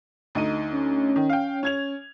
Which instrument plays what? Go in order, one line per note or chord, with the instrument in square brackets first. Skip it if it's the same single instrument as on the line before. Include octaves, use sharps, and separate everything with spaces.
[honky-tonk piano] D2 D#4 D#7
[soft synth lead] C#4
[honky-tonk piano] D#3
F5 G5
C#4 G#6 F7